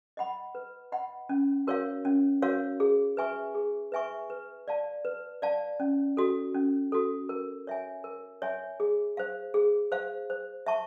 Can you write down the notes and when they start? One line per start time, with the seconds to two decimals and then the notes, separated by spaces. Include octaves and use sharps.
0.17 D#5 F#5 B5
0.55 B4
0.92 D#5 F#5 B5
1.29 C#4
1.67 F#4 A#4 C#5 F5
2.05 C#4
2.42 F#4 A#4 C#5 F5
2.80 G#4
3.17 B4 E5 G#5 C#6
3.55 G#4
3.92 B4 E5 G#5 C#6
4.30 B4
4.68 D5 F5 A5
5.05 B4
5.42 D5 F5 A5
5.80 C#4
6.17 F#4 A4
6.54 C#4
6.92 F#4 A4
7.29 A#4
7.67 C#5 E5 G#5
8.04 A#4
8.42 C#5 E5 G#5
8.80 G#4
9.17 C5 F5
9.54 G#4
9.92 C5 F5
10.30 C5
10.67 E5 A5 C#6